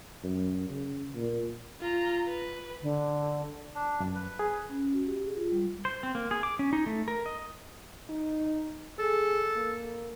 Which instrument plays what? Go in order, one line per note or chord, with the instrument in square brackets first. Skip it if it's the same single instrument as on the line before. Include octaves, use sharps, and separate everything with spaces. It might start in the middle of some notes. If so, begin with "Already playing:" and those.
[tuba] F#2
C#3
A#2
[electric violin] F4 A#5
B4
[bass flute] D3
[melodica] D4
[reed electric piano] F#2
[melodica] B4
[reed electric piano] G#4
[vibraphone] C#4
F#4
G4
G#4
F4
G3
[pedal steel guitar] C5
C4
A#3
G#4
D6
C#4
D#4
A3
A#4
D#5
[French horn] D#4
[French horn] G#4 [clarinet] A4
[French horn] A#3